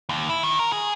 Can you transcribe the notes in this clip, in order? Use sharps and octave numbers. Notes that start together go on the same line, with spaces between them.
D#2
E4
D#3
A#4
G#4